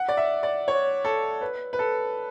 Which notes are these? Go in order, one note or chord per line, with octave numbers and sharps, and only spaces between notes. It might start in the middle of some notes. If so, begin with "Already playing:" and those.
Already playing: F#5
D5
E5
D5
C#5
A4
B4
B4
A4